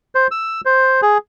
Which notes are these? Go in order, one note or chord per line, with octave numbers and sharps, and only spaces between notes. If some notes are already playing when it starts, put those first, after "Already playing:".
C5
E6
C5
G#4